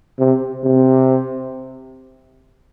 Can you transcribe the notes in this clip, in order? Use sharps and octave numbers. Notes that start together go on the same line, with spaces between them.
C3
C3